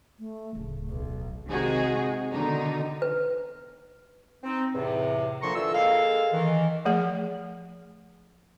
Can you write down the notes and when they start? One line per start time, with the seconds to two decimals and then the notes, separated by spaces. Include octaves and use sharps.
0.19 A3
0.55 D1 C#3
0.89 B1
1.50 C3 D#3 G#3 D#4 F#4 G#4
2.32 B2 D3 D#3 D#4
3.02 B4
4.44 C4 D#4
4.74 E2 A2 C3
5.41 A#2 D3 F3 A#5 C6 C#6
5.55 D3 E3 F4 E6
5.74 G#3 A#3 A4 F5
6.33 D#3 E3
6.85 F3 A3 G#4